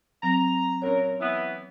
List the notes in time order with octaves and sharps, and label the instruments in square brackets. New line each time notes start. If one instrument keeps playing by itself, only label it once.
[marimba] F#3 C4 [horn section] A#5
[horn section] A#2 F#3 A#4 [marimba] C#4 C#5
[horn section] E3 B3